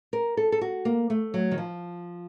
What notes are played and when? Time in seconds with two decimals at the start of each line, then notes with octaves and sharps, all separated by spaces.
0.13 A#4
0.37 A4
0.52 A4
0.61 F#4
0.85 A#3
1.10 A3
1.34 F#3
1.51 D#3
1.58 F3